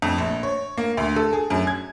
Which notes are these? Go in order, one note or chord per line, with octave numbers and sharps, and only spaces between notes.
F2
A#1
C#5
A#3
D2
A4
G#4
F#2
G#6